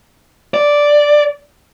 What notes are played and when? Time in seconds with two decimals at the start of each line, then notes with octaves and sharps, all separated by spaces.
0.54 D5